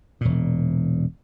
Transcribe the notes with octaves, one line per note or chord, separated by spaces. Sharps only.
E1 A#2